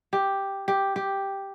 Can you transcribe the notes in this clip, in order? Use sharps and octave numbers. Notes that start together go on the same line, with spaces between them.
G4
G4
G4